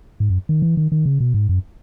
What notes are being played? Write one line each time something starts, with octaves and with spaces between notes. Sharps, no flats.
G#2
F#2
D#3
E3
D#3
D#3
C#3
B2
G#2
F#2